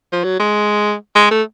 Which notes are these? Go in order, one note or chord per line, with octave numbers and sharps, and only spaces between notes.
F3
F#3
G#3
G#3
A3